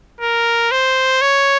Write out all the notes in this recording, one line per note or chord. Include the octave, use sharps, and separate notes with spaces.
A#4
C5
C#5